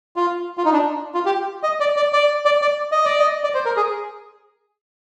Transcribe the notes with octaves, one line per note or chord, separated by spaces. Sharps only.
F4
F4
D#4
D4
F4
G4
D#5
D5
D5
D5
D5
D5
D#5
D5
D#5
D5
C5
A#4
G#4